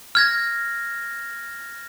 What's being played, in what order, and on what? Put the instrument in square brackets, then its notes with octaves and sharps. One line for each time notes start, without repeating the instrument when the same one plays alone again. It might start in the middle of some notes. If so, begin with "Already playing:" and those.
[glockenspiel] F6 G#6 A#6